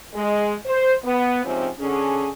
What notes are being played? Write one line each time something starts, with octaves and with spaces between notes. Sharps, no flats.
G#3
C5
B3
G#2 C3 F3 C4 C#4
D3 C#4 G#4